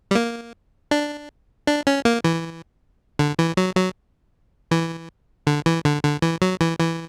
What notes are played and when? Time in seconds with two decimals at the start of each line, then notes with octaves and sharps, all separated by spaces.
0.11 G3
0.15 A#3
0.91 D4
1.67 D4
1.87 C#4
2.05 A#3
2.24 E3
3.19 D3
3.39 E3
3.57 F#3
3.76 F#3
4.71 E3
5.47 D3
5.66 E3
5.85 D3
6.03 D3
6.22 E3
6.42 F#3
6.61 E3
6.80 E3